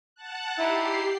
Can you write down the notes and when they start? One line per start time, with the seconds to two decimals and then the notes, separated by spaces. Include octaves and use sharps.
0.15 F#5 A5 F#6
0.58 D#4 E4 G4 C7